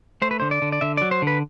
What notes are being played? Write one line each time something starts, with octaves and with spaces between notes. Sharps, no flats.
A3 C5
B4
D3 C5
D5
D3
D5
D3 E5
F#3 D5
C5
D3 B4